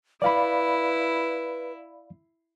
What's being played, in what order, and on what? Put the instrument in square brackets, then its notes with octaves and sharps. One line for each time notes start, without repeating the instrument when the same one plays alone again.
[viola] E4 [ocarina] B4 [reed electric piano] D5 F5 B5